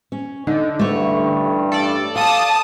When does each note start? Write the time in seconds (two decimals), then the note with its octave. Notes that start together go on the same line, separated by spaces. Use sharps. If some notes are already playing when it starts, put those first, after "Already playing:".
0.12 C#4
0.47 D3 D#4
0.79 A1 G2 A3 C#5
1.72 A4 D5
2.16 F5 A5 D#6